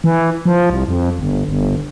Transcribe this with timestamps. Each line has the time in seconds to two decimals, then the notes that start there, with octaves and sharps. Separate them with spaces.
0.04 E3
0.45 F3
0.70 C2
0.88 F2
1.19 G1
1.48 G1